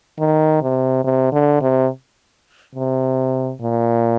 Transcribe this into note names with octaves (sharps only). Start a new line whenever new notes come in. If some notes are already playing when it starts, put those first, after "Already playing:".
D#3
C3
C3
D3
C3
C3
A#2